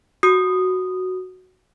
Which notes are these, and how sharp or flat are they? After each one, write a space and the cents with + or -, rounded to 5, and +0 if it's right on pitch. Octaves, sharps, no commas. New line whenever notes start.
F#4 +0 D#6 -10